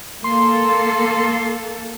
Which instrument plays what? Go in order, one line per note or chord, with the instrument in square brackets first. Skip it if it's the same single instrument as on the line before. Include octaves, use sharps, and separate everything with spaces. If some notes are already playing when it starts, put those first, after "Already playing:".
[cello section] A#3 A4 [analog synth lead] C6